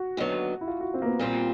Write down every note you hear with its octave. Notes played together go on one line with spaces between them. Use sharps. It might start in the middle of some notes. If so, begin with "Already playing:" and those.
Already playing: F#4
D#2 D3 F#3 B3
E4
F4
F#4
C4
A#3
B3
A#2 G3 A#3 C4 F4